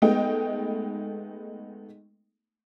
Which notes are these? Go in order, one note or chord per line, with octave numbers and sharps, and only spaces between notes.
G#3 A3 B3 D#4 D#5 G5